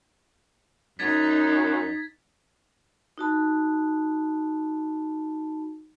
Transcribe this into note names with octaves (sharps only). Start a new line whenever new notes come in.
F#2 D#4 G#6 A6 B6
D#4 F#4 A5 B5